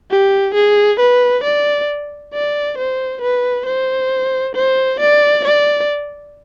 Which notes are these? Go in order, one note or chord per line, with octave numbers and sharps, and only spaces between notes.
G4
G#4
B4
D5
D5
C5
B4
C5
C5
D5
D5